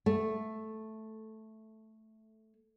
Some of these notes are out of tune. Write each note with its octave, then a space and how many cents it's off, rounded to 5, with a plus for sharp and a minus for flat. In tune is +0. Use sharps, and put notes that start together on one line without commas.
A3 -5